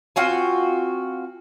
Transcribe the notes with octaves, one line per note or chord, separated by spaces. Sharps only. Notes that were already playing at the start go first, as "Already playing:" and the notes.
C4 F4 F#4 G#5